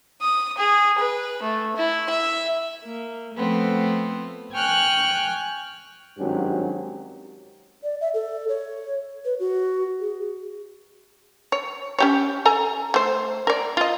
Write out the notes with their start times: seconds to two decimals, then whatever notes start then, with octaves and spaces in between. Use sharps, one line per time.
0.22 D#6
0.58 G#4
0.99 B4
1.42 A3
1.76 E4
2.10 E5
2.84 A#3
3.34 F3 A3 B3 C4
4.53 G5 G#5 C#6 F6 F#6
6.17 G#1 G2 F#3 C#4 G4
7.83 D5
8.01 E5
8.14 A4
8.49 C#5
9.25 B4
9.40 F#4
10.01 G#4
11.52 C#5
11.99 C#4 G4 C#5
12.45 A4 G#5 A#5
12.94 A3 C5
13.47 A#4 D5
13.77 F4 D#5